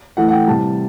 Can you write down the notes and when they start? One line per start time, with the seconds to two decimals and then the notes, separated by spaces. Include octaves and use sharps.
0.17 A2 E3 A3 F#5
0.28 F#5
0.33 G5
0.47 C3 E3 G3 A5